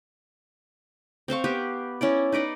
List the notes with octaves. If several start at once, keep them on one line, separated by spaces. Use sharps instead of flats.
C4 C5 F5 C#6
B3 G4 B4
C#4 E4 D5
D#4 B4 D5 D#5